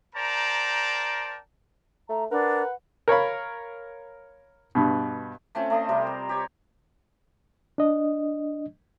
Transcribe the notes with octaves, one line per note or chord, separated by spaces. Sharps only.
A#4 C5 D5 G5 A5 A#5
A3 A#5
D4 A#4 B4 F#5
A#4 C#5 F5 B5
G2 B2
A3 C4 C#4 F4
A3 D#5 C6
C3 G3 G4 A#4
A#5
G4 C#5
D4 D#5